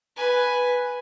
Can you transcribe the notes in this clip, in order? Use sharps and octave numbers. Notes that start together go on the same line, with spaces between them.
B4 G#5